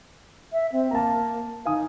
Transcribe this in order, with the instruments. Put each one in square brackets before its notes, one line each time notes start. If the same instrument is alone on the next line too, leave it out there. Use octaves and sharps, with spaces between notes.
[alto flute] E5
C4
[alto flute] A#3 [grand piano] A5 A#5
[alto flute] D#4 [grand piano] F5 G#5 D#6